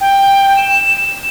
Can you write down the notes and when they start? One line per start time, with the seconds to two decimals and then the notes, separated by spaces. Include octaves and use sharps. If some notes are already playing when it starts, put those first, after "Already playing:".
0.01 G5
0.57 E7